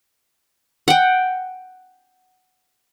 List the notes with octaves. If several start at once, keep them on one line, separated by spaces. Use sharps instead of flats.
F#5 G5